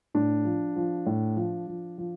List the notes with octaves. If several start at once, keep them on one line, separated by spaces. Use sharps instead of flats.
A2 D4
F3
F3
A2
F3
F3
F3